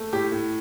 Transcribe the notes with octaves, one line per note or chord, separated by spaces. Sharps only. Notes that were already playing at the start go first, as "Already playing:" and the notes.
Already playing: A3
A2 G4
A2